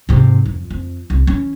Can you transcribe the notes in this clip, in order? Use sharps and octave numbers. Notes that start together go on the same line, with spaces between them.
G#2 C3
F2
F2
C2
E3 C#4